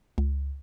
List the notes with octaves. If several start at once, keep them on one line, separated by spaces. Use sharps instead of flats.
C#2